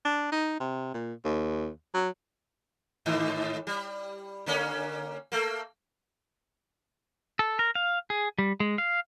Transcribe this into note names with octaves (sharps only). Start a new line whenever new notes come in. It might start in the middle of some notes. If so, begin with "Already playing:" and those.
D4
D#4
C3
A#2
D#2
F#3
G#2 D#3 E3
G3
D3 A#3 C#4
A3 A#3
A4
A#4
F5
G#4
G3
G#3
F5